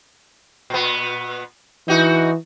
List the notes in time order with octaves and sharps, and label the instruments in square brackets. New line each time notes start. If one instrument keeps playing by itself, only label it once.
[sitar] A#2 B3
[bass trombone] E3 [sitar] D#4 F#4